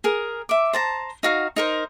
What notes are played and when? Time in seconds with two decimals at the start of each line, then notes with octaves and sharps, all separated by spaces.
0.04 G#4 A#4
0.49 E5 D6
0.73 C5 A5 A#5
1.23 D#4 F#4 F5
1.56 D#4 A#4 C5